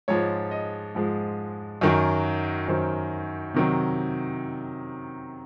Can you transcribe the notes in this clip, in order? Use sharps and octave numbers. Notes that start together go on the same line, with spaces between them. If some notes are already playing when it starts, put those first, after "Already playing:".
G#2 F3 G#3 C#5
D#5
G#2 F3 G#3
F#2 D#3 F#3
F#2 D#3 F#3 C5
C3 D#3 F#3